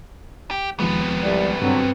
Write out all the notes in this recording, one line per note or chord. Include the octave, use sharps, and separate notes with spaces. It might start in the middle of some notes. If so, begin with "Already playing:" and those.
G4
D#2 C3 F3 G#3 B3
C2 G3 D5
G2 D3 F#3 C4